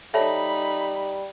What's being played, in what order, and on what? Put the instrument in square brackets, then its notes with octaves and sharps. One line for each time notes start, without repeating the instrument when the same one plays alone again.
[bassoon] G3 [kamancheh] D#4 B5 [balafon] A4 C#5 A5 [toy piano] E5